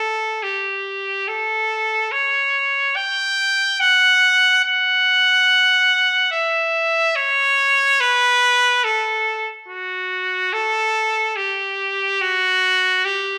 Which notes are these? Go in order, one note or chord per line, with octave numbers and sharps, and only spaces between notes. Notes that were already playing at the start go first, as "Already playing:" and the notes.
Already playing: A4
G4
A4
C#5
G5
F#5
F#5
E5
C#5
B4
A4
F#4
A4
G4
F#4
G4